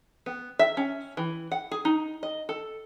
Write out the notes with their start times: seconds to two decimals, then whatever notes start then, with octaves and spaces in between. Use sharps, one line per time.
0.26 B3
0.59 E5
0.77 C#4
1.17 E3
1.52 F#5
1.71 G#4
1.85 D#4
2.23 D#5
2.49 A4